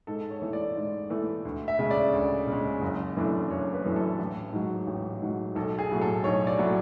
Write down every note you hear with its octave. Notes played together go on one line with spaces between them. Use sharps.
G#2 A4
C#5
E3 A3
D5
G#2
E3 A3
D2
E5
C#3 G#3
D5
D2
C#3 G#3
F#1
F#2 E3 A3 D4
F#1 C#5
B4
F#2 E3 A3 D4
A4
A1
G#2 F#3
A1
G#2 F#3
B1 A4
G#4
A2 F#3 A3
A4
B1 C#5
D5
A2 F#3 A3